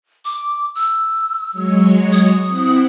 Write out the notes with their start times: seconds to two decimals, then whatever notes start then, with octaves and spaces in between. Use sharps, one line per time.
0.25 D6
0.75 E6
1.52 F#3 G#3 C#5
2.13 D#6
2.46 C4 E4 F#5